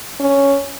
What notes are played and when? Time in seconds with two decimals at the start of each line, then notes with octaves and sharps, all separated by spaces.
0.20 C#4